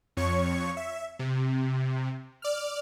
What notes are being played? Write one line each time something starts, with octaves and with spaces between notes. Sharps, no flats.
F2 C#5 C#6
E5
C3
D5 F6